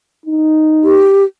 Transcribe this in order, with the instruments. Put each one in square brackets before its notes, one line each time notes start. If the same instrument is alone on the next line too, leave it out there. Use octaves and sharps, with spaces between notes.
[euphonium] D#4
[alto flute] G4